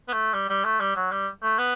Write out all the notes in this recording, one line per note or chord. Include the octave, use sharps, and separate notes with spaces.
B3
A3
G3
G3
A3
G3
F#3
G3
A3
B3